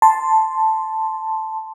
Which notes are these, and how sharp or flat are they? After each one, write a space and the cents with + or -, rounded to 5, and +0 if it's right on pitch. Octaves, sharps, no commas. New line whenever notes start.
A5 +0 C6 +0